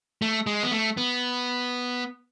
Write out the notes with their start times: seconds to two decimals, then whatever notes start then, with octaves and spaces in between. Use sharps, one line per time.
0.22 A3
0.47 G#3
0.63 B3
0.72 A3
0.97 B3